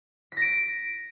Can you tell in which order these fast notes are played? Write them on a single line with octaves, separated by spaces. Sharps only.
B6 A#6 D7